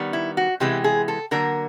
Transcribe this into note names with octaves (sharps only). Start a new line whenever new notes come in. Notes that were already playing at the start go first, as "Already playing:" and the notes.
Already playing: D#3 G3 B3
E4
F#4
C3 E3 G#3 B3 G4
G#4
A4
D3 F#3 A#3 A#4